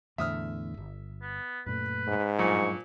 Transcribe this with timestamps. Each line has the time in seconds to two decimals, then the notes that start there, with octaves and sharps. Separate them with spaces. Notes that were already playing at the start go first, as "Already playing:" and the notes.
0.18 E2 A2 D3 E5 D#6 F6
0.74 D1 G1
1.22 B3
1.66 F#2 A#2 A3 B4
2.07 G#2
2.39 G2 A#2 F3 F#3 C#6